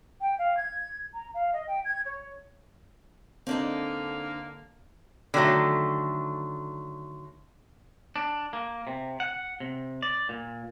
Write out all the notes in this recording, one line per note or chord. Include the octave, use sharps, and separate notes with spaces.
G5
F5
G#6
A#5
F5
D#5
G5
G#6
C#5
D3 A#3 C4 D4 D#4
D3 D#3 F#3 A3
D4
A#3
C3
F#5
C3
D5
A#2